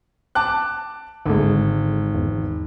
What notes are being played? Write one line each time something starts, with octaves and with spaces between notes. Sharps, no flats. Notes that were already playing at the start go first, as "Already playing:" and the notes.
A5 D6 F#6
G#1 D3 G#3
E2